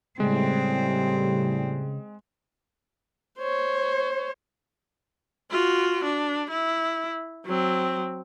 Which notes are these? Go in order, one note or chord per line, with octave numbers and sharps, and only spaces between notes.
A2 C#3 G3 G#3 C4
C5 C#5
F4 F#4
D4
E4
F#3 C4